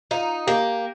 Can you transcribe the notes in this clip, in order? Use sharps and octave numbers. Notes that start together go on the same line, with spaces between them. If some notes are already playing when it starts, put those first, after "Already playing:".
D#4 F4
A#3 G4